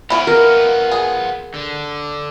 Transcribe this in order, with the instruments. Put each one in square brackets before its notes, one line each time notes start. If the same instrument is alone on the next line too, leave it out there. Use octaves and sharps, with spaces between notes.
[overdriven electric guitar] B3 F4 [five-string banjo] E4 C#5
[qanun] A#4
[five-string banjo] G#4
[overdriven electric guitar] D3